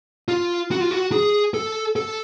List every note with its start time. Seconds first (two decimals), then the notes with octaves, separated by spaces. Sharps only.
0.29 F4
0.71 F#4
0.81 F4
0.91 F#4
1.12 G#4
1.54 A4
1.96 A4